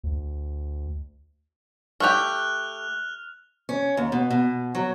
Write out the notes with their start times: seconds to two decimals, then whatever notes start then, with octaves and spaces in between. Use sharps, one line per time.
0.04 D2
2.00 A3 G4 F6 F#6 F7
3.69 C#4
3.97 D#2
4.12 B2
4.30 B2
4.75 F#3